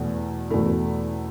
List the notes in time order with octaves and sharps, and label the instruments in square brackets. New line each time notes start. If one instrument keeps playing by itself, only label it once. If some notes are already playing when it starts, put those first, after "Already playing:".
Already playing: [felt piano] E2 B2 A3
E2 B2 A3 E4